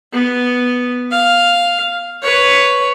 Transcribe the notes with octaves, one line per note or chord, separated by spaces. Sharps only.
B3
F5
B4 C#5